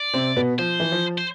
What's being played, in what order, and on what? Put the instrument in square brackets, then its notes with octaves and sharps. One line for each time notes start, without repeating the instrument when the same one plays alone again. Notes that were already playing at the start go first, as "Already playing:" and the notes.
Already playing: [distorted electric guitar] D5
[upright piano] C3 C4
B2 B3
[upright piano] F3 [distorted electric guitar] C5
[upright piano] E3
F3
[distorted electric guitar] C5